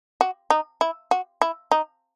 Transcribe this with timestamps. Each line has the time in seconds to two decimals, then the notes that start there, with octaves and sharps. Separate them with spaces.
0.21 F#4
0.50 D#4
0.81 E4
1.11 F#4
1.42 E4
1.71 D#4